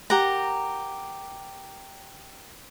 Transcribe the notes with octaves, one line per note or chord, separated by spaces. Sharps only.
G4 A#4 F#5 A#5